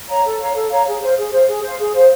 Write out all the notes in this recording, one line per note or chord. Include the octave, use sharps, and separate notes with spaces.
C#5 F5 A#5
A4
C#5 F5 A#5
A4
C#5 F5 A#5
G#4
C5 F5
G#4
C5 F5
G#4
C5 F5
G#4
C5 F5